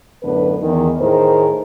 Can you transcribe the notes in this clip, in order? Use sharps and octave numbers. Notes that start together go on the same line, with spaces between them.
F#2 A2 D3 B3 B4
E2 D#3
A2 D#3 G#4 A#4 C5